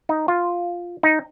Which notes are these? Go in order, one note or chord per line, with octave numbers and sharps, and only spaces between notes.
D#4
F4
D#4